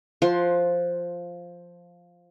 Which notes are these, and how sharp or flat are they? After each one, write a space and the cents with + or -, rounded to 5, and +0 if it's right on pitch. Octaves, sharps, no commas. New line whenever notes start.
F3 +0 F#5 +0 C6 +15